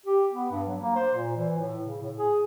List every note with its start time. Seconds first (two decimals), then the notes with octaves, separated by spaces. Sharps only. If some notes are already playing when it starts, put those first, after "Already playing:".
0.06 G4
0.33 B3
0.51 G2
0.68 F#3
0.81 A#3
0.96 C5
1.15 A#2
1.36 E3
1.58 A2
1.85 C#3
2.02 A2
2.16 G#4